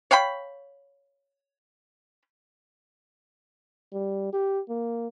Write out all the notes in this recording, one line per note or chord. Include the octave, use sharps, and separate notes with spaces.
C#5 F5 G5 B5
G3
G4
A#3